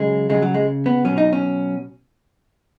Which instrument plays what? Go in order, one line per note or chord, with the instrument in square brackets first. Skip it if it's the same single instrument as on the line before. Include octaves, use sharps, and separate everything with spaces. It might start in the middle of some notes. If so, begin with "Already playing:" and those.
Already playing: [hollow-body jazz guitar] C#3 F#3 G#3
C#3 F#3 G#3
F#3
G#3
B3
B2 F#3 C#4
D#4
C#4